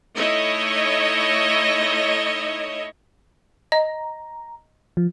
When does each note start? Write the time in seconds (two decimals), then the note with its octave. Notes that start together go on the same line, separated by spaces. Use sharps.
0.17 A3 D#4 E4 C#5 D#5
3.72 D#5 A#5
4.97 F3